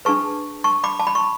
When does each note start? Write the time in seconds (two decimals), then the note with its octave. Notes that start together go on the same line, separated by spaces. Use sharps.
0.05 D4 G#4 B4 A5 C#6
0.64 A5 C#6
0.84 B5 D6
1.00 A5
1.07 B5
1.15 C#6